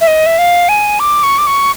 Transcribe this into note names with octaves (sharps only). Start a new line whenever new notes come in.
E5
D#5
E5
F5
G#5
D6
C#6
D6
C#6